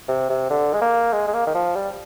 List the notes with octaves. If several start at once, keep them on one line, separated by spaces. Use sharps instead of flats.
C3
C3
D3
G#3
A#3
G#3
G#3
A#3
D#3
F3
G3